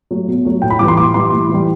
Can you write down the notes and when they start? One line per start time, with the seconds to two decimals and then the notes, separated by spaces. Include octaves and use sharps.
0.11 F#3 A3
0.27 B2
0.45 F#3 A3
0.62 A2 G5
0.70 B5
0.79 E3 G3 D6
0.88 C6
0.97 A2 D6
1.14 E3 G3 C6
1.32 A2
1.49 E3 G3